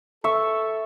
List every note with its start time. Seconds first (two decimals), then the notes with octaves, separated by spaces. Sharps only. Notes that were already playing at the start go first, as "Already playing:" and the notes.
0.24 A4 E5 C#6